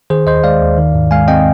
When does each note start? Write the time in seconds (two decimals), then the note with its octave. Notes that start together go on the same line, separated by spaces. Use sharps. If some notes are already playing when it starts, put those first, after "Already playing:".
0.10 D#3 G#4 C5
0.26 D#2 C5 D#5
0.44 G#3 D5 F5
0.61 D#2
0.78 D#3
0.94 G#2
1.11 G#3 F5 G#5
1.28 C4 D#5 G5